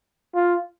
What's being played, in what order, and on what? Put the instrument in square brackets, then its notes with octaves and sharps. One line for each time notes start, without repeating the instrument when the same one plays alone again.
[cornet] F4